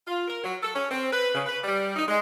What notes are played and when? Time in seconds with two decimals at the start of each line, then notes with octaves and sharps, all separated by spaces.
0.07 F4
0.28 A#4
0.44 F#3
0.63 A4
0.75 C#4
0.91 C4
1.13 B4
1.35 C#3
1.46 B4
1.64 G3
1.96 D#4
2.08 G#3